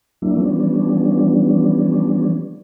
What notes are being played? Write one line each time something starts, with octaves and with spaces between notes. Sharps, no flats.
F#3 A#3 D4 E4
E3 F3 G3 B3 C#4 D4